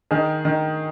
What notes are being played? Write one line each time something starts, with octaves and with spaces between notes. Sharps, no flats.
D#3 G#4
D#3